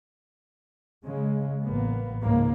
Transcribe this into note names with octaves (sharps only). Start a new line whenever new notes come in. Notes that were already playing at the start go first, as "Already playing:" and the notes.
C#3 G#3
A1 A#3 B3
C#2 G#2 A#3